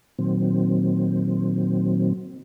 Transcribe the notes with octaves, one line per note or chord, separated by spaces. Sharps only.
A#2 D#3 F#3 C4